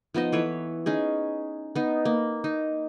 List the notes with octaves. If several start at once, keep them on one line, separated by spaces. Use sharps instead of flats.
F3 B3 D#4 D#5
E3 A4 B4 C#5
C#4 D#4 G#4
B3 D#4
A#3
D#4